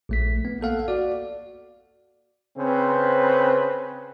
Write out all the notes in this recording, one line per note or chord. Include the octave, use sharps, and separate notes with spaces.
A#1 A3 B6
B3
A#3 A4 F5 F#5
F#4 D5
C#3 C4 B4 C5